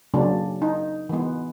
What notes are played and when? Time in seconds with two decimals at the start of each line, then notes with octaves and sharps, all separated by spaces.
0.14 C#3 F#3 A#3 C#4 D4
0.62 D#4
1.09 E3 G#3 B3